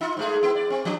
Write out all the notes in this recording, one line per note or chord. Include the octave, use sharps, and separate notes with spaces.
D#4 F4
G#2 A3 G#4
B3 E4
D5
C4
F3 D4